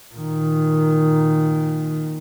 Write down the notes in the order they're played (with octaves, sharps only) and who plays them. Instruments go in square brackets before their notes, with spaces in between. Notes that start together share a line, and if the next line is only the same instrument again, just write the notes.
[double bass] A#2 D#3